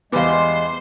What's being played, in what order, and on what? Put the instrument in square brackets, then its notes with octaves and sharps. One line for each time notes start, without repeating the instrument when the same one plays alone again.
[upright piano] E2 G3 B3 [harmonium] G#3 [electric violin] C5 C6 [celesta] F5 D6